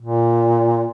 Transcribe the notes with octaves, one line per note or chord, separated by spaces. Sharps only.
A#2